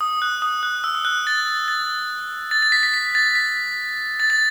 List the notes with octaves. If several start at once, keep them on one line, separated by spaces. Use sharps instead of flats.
D#6
F#6
D#6
F#6
E6
D#6
F#6
A6
A6
A6
A6
B6
B6
B6
A6
B6
A6
A6